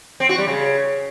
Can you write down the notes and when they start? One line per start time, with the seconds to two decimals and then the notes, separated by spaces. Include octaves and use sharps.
0.20 C4
0.29 F#4
0.38 G3
0.47 C#3